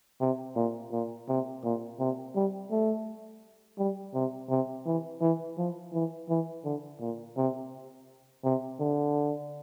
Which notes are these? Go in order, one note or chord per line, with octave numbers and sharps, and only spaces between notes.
C3
A#2
A#2
C3
A#2
C3
G3
A3
G3
C3
C3
E3
E3
F3
E3
E3
D3
A#2
C3
C3
D3